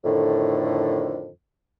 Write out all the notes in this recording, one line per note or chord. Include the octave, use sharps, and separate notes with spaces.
F2 A2 D3 D#3